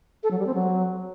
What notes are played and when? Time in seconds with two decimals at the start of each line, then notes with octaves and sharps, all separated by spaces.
0.23 A4
0.31 F#3
0.39 G3
0.47 C4
0.54 F#3